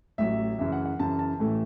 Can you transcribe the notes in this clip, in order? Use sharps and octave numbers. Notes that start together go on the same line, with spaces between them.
A1 A2 F#3 E5
F#2 C#3 E3 E5
F#5
F#5
F#2 C#3 E3 A5
A5
A1 A2 E3 A3